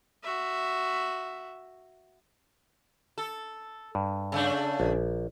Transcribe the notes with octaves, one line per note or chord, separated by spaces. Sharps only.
F#4 E5
A4
G2
C#3 A3 D4
A#1